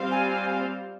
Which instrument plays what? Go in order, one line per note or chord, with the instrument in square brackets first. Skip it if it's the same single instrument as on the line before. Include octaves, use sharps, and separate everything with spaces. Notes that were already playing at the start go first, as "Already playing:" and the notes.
Already playing: [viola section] G3 C4 F4 C5 F5
[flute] G#5